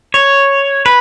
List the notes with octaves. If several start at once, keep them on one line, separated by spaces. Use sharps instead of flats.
C#5
B4